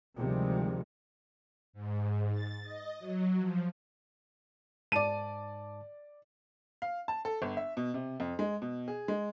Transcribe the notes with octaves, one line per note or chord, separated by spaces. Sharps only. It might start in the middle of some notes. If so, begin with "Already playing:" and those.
D2 C3 D#3 F3 G3 G#3
G#2
A6
D#5
F#3
F3
G#2 D5 A5 D#7
F5
A5
A4
G1
E5
B2
C3
F2
G#3
B2
G#4
G#3